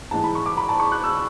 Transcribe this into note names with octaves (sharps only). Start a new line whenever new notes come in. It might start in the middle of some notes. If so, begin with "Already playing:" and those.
G#2 E3 G#3 A5
B5
C#6
D6
B5
A5
C#6
F#6
E6